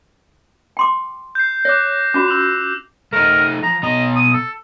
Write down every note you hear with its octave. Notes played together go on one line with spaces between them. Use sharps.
G5 C6 D6
G6 C7
C#5 D6 F#6 A#6
C#4 F4 F#4 D6
E6 F7
A3 D#4 A#4
F3 A#5
B2 D#5 A#5
D#6
A4